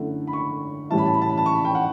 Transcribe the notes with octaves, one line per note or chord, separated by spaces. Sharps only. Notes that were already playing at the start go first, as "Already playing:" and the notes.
Already playing: F#2 D3 A3 E4 F#5
B5
C#6
A2 E3 G3 C#4 E4 A5
B5
A5
B5
A5
B5
A5
C#6
B5
G5
F#5